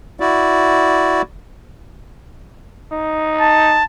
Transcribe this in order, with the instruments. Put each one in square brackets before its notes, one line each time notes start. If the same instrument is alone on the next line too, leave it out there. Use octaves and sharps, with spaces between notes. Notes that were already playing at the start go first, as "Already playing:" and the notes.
[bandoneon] E4 F#4 D5
[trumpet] D#4
[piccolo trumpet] A5